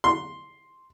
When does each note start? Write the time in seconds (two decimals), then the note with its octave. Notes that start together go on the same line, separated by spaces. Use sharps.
0.04 C6